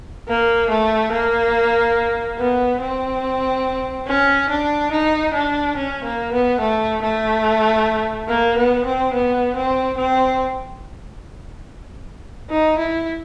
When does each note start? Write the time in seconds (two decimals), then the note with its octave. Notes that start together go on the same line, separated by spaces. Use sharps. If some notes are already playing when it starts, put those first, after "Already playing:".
0.28 A#3
0.70 A3
1.12 A#3
2.39 B3
2.81 C4
4.07 C#4
4.49 D4
4.92 D#4
5.34 D4
5.76 C#4
6.04 A#3
6.32 B3
6.60 A3
7.02 A3
8.29 A#3
8.57 B3
8.85 C4
9.13 B3
9.56 C4
9.98 C4
12.50 D#4
12.78 E4